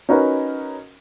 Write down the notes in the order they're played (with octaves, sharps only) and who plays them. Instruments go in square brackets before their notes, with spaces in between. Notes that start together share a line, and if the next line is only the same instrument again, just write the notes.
[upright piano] C#4 D#4 F#4 A#4 B4